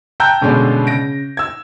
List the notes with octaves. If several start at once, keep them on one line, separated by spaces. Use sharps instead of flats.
G5 A5 A#5 E6 F#6 G6
G2 B2 D3 G#3 C#4 D4
C#3 A#6 D7
E6 G#6